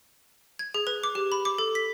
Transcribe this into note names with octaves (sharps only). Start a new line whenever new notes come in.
G#6
G#4
B4
D6
G4
B5
D6
A4
B6